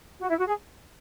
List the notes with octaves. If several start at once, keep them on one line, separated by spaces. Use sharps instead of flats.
F#4
E4
F#4
G#4